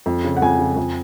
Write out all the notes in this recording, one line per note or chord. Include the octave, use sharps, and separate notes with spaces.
F2
C#3
F#5
F2 G#5
C#3
F2